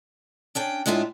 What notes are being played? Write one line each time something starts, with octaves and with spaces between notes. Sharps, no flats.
C#4 D4 G5
A2 G#3 D4 F4 E5